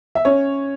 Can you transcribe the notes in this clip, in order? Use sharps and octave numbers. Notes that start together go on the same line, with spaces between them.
E5
C#4 C#5